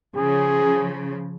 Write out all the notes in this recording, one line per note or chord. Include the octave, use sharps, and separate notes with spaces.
C#3 F3 G#4